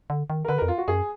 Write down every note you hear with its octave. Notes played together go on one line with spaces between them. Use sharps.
D3
D#3
A#4
D3 B4
F2 A#4
F4
F#4
F#2 G#4